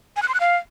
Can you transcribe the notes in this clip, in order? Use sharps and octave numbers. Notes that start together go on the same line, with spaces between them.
G#5
F#6
C6
F#6
F5